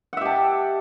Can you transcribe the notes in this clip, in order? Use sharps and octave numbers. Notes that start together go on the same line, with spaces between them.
G4 E5 F#5 A5